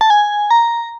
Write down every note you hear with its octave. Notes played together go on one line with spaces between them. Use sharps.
A5
G#5
A#5